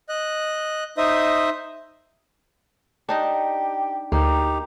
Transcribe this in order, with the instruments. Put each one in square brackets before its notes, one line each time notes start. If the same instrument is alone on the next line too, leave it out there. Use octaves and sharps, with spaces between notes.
[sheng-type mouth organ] D#5 F#6
D#4 C5 D#5 E5 D#6
[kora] D4 D#4 D#5 [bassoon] G4
[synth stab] D2 [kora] A#3 [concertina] D#4 G4